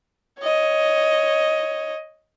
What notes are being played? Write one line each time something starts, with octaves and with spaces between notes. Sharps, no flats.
C#5 D#5